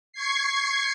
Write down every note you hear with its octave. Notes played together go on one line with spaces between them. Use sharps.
C#6 G#6 C7